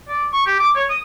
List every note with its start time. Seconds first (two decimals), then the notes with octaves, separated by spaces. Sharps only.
0.08 D5
0.33 C#6
0.46 G4
0.59 D6
0.76 C#5
0.90 D#6